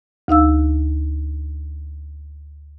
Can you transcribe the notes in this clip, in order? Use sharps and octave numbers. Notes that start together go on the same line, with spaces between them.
D2 D#4 F5 E6